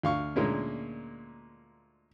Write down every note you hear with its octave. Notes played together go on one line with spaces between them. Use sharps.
D2 F5 C#6
D2 A#2 G#3 A#3 C#4